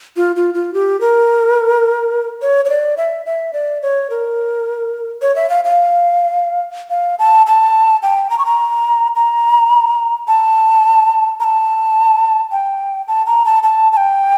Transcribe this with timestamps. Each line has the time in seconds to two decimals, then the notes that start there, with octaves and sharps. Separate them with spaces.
0.16 F4
0.36 F4
0.54 F4
0.74 G4
1.01 A#4
2.42 C#5
2.65 C#5
2.69 D5
2.97 E5
3.26 E5
3.53 D5
3.82 C#5
4.10 A#4
5.22 C#5
5.36 E5
5.50 F5
5.65 F5
6.90 F5
7.19 A5
7.47 A5
8.03 G5
8.30 A#5
8.39 C#6
8.46 A#5
9.16 A#5
10.28 A5
11.40 A#5
11.44 A5
12.51 G5
13.08 A5
13.26 A#5
13.45 A5
13.63 A5
13.93 A5
13.97 G5